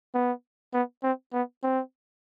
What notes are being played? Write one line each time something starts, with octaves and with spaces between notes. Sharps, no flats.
B3
B3
C4
B3
C4